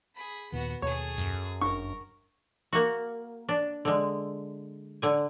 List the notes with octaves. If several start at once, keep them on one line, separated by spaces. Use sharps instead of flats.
G#4 B5
D#2 A#2 D#3 B3 F#4
D#2 B2 G#4 A4 C#5
F#2
G1 D4 A#4 C#6
A#3 F#4
D4
D3 G#3
D3 G#5